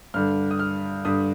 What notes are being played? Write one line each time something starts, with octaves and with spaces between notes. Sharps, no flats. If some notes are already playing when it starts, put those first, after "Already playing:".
G2 D3 G3 F6
D#6
F6
G2 D3 G3 D#6